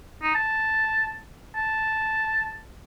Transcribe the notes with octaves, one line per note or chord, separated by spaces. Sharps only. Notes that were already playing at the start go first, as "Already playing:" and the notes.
D#4
A5
A5